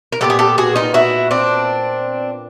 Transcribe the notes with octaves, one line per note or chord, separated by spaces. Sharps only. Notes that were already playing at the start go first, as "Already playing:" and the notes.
A#4
A#2 G3 B3 G4 A4
G#4
G4 A4
F#4 G#4
D#4 F4
E4 F#4
C4 D4